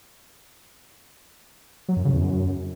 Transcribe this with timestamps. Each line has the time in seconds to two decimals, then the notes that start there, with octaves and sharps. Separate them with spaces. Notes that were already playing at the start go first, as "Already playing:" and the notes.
1.88 F#3
1.97 F#2
2.05 C#3
2.13 E2
2.21 F#2